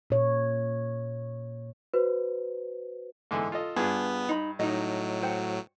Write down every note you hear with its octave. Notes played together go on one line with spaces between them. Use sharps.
A#2 C#5
F#4 B4 C5
G#2 D3 E3
F4 A4 D#5
G2 B3 D4 F4 G#4
D#4 B5
A2 F#3 D#4 D#5
F#4 C5 G5